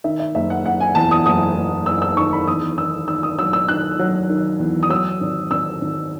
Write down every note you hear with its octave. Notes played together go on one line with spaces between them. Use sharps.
D#3 E5
E5
F#1 E5
F#5
F#1 F#5
G#5
E2 A5
D#6
F#1 D#6
F#1
F#1 E6
E6
D#3 C#6
B5
E2 D#6
D#3 E6
D#3 E6
D#6
F#3 E6
E6
D#3 F#6
F#3
D#3
E2
D#6
F#3 E6
G#1
G#1 E6
G#1